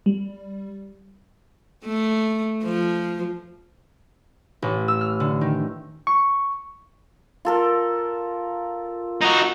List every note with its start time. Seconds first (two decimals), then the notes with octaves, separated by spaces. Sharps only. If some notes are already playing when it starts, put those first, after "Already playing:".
0.06 G3
1.85 A3
2.63 F3
4.62 A1
4.88 E6
5.01 F6
5.20 D3
5.41 D#3
6.07 C#6
7.45 F4 A4 A#4
9.21 D#4 F#4